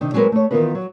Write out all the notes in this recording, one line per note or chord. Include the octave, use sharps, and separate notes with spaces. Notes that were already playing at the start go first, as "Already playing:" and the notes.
C3 D#3 D4
F#3 G#3 C4 G#4 A#4 B4
A3 C#5
D#3 E3 B3 F4 A#4 B4
F#3